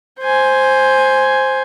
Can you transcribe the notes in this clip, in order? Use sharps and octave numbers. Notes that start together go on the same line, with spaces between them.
C5 G#5